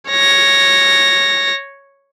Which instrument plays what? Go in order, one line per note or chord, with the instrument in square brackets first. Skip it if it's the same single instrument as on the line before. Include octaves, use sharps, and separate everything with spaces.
[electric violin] C#5 A#6